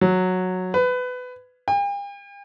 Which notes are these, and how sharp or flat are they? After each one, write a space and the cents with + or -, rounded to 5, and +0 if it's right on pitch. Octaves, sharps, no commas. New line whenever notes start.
F#3 -10
B4 +20
G5 +45